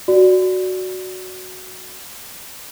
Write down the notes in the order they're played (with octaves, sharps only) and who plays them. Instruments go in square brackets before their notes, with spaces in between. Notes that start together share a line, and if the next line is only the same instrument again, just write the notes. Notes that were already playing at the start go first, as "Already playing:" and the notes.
[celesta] F#4 D5